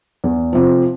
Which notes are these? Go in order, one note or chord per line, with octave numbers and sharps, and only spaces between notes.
E2
C3 F3